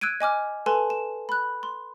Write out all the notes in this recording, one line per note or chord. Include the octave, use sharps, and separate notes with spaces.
E6 F#6 G#6 D7 D#7
D#5 G#5 D6 F6
A4 B4 G#5 A5 C6
E7
B5 F#6
C6